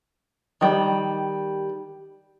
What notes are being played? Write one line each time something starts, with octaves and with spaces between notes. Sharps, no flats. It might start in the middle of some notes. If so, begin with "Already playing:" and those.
D#3 G3